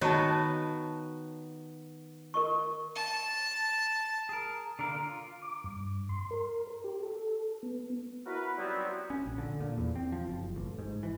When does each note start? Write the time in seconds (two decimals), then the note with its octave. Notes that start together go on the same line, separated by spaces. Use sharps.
0.01 D#3 B3 F#4 C#5 A5
2.34 A#4 D#5 C#6
2.95 A5
4.29 G#4 A#4
4.79 D3 A#4 F5
5.00 F4
5.42 D6
5.64 G2
6.09 C6
6.31 A#4
6.84 G4
7.03 A4
7.63 B3
8.26 E4 F#4 A#4 B4
8.57 F#3 G3 B3 C4 D#4 E4
9.10 C#4
9.26 A#1
9.38 D3
9.60 A#2
9.78 E2
9.96 C4
10.12 F3
10.28 F#1
10.56 A1
10.79 G#2
11.03 E3